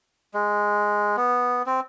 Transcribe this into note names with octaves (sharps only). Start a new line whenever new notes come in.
G#3
B3
C4